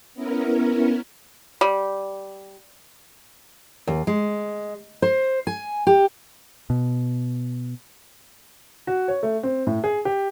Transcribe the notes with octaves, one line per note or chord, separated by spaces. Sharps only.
B3 C#4 E4 A#4
G3
D#2
G#3
C5
G#5
G4
B2
F#4
C#5
A3
C4
A2
G#4
G4